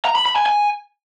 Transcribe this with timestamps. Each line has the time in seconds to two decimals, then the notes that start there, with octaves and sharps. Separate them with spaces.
0.05 A#5
0.15 B5
0.26 B5
0.36 G#5
0.46 G#5